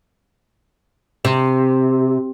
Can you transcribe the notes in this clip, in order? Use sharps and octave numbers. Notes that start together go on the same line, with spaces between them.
C3